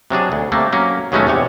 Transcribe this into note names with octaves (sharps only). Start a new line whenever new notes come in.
C3 F#3 D4 G#4
D2
C3 A3 A#3
F#3 A#3 C#4
D#2 B2 F#3 G#3 A3 C#4
E2 C3 C#5